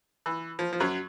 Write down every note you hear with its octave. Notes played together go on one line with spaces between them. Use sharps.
E3
F3
F3
F#2 F#3